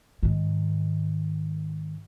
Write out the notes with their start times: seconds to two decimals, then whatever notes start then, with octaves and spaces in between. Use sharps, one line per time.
0.23 G#2 D#3